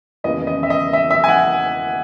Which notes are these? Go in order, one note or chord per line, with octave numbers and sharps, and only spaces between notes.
E1 D#2 C#3 E3 D#5
D#5
E5
D#5
E5
E5
G#5
F#5